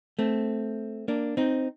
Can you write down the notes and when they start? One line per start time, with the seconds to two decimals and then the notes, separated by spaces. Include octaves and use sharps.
0.19 A3 C4
1.08 A#3 D4
1.37 C4 D#4